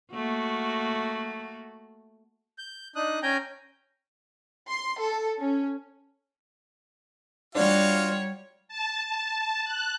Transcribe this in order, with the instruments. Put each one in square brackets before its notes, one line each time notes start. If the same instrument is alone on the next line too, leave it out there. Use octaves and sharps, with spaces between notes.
[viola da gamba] A3 A#3 F#4
[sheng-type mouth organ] G6
D4 D#4 D#6 F#6
C#4 G5 G#5 A#5 G6
[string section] C6
A4
C#4
[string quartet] G3 C#5 [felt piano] D4 [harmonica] F4 F#4 F5
[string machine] A5
A5
F#6